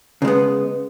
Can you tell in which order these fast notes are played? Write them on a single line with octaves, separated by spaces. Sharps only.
C#3 G#3 B3